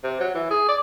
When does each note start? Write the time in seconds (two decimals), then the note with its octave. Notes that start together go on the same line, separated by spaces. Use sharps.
0.04 C3
0.20 F#3
0.35 E3
0.51 G#4
0.69 D5